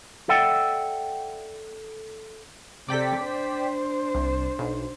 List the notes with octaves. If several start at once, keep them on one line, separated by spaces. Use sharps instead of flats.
A4 D5 E5 F#5 G5
C3 A4 D5 G5 B6
D4 C5
C2
B1